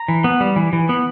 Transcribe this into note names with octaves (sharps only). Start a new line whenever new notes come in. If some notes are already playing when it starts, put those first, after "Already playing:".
Already playing: A#5
E3
B3
G3
E3
E3
B3